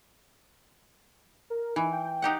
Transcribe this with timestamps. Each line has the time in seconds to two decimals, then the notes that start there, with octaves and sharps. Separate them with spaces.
1.50 A#4
1.76 E3 D#4
1.92 G5
2.22 D#4 G4 F#5